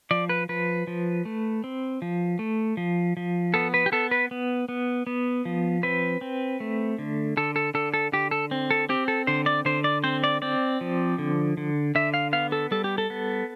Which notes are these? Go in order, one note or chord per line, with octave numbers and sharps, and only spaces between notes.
F3 D5
B4
F3 B4
F3
A3
C4
F3
A3
F3
F3
B3 A4
B4
G4
B3 A4
B4
B3
B3
B3
F3
C4 B4
C4
A3
D3
D3 A4
A4
D3 A4
A4
D3 G4
A4
C4
A4
C4 G4
A4
D3 C5
D5
D3 C5
D5
C4 C5
D5
C4 D5
F3
D3
D3
D3 E5
F5
B3 F5
A4
G3 A4
G4
A4
B3